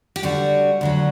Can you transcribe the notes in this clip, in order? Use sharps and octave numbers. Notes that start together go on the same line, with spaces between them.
G4
D2 D3 G3 F#4
D2 D3 F#3